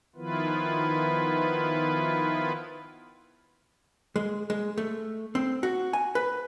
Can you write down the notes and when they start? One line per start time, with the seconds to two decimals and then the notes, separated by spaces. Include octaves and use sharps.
0.16 D#3 F3 B3 E4 F4 B4
4.16 G#3
4.50 G#3
4.78 A3
5.35 C4
5.63 F#4
5.93 G#5
6.15 B4